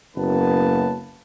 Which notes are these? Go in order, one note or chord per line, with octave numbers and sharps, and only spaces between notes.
F#1 F#2 A#3 B3 B4 A5